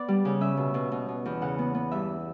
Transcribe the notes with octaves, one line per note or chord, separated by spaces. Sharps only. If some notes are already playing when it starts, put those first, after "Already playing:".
Already playing: B3 D5
G3
C#3
C#4 E5
B2
B2
B2
B2
E2
C#3 F#5
B3
B3
G2 E5